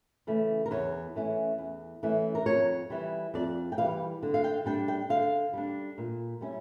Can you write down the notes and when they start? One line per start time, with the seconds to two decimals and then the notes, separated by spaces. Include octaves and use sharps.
0.27 C#3 E3 A3 C#4
0.66 A#4
0.71 E2 C#5
1.16 E3 A3 C#4
1.58 E2
2.03 E3 A3 C#4
2.35 A#4
2.46 F2 C#5
2.90 E3 G3
3.34 F2 D5
3.72 G5
3.78 E3 G3 F5
4.23 D3
4.34 F5
4.44 G5
4.66 G3 D4 G5
4.88 G5
5.09 D3 F5
5.53 G3 D4
5.98 A#2
6.41 G3 C#4 E4